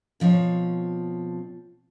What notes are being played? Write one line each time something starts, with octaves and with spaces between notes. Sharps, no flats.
B2 F3 C4 C#5